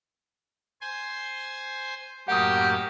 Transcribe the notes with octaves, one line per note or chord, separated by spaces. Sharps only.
C5 G#5 C6
F#2 A2 A#3 G4 F#5 D#6